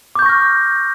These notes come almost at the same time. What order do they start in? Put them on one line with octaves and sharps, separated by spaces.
D6 G6 C#6 A#6 F6